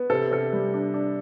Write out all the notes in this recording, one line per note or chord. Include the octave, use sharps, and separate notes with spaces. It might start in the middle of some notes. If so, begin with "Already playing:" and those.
Already playing: B3
C3 A4
C3 A4
G3
D4
D4